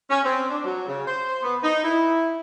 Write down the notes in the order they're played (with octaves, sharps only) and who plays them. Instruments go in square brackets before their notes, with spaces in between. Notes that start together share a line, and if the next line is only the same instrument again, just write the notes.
[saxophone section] C#4
C4
D4
F#3
C#3
C5
B3
D#4
E4